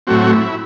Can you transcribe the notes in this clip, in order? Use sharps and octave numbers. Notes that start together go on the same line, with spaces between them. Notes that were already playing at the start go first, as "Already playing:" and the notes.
A2 F#3 A3 C4 F#4
E4